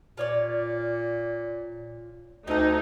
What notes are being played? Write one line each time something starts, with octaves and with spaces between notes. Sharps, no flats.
A#2 F4 C#5 D5
D2 C4 D#4 A4